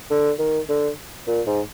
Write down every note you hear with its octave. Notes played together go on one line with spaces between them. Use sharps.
D3
D#3
D3
A#2
G#2